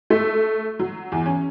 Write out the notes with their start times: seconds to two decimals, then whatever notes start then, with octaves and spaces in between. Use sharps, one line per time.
0.10 A3
0.79 F#3
1.12 E2
1.26 C#4